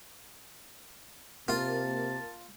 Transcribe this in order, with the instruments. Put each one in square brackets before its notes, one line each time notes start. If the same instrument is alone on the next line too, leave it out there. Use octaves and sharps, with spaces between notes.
[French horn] C3 [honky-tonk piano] A#3 [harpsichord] F4 [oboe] A5